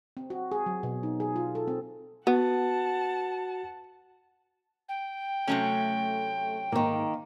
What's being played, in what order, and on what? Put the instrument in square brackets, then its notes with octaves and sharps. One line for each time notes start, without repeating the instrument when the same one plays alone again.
[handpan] C4
F#4
G#4
F#3
B2
D#4
G#4
F4
A4
C4
[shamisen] B3 [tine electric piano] F#4 [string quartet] F#5 A5
[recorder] G5
[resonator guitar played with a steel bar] C3 F#3 C#4 [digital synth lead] A3
[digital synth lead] G#2 [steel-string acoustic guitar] D#3 A#3